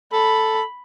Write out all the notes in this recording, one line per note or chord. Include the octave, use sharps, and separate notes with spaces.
A4 B5